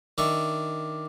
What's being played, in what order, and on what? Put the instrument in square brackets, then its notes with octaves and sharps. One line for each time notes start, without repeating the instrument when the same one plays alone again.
[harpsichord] D#3 D4 E5 C#6